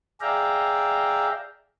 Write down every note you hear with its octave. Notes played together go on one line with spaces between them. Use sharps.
G#4 D5 E5 F5 G5 A#5